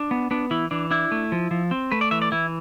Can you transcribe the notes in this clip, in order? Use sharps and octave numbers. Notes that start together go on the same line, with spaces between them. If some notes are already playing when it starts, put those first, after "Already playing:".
Already playing: D4
B3
B3 D4
E3 E4
E3 D4
D4 E4
A3
F3
F3
C4
A3 B4
D5
E3 E5
D5
E3 E4